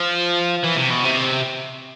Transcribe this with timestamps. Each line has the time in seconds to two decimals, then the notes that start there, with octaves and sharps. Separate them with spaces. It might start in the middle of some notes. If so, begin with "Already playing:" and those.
Already playing: F3
0.63 E3
0.76 C3
0.90 B2
1.04 C3